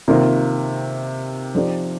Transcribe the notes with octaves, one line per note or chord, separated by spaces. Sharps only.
C3 D#3 A#3 F4 A#4
F3 C4 D#4 G4 D5